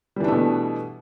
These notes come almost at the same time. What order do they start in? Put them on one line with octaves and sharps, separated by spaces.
G3 E3 D4 A3 B2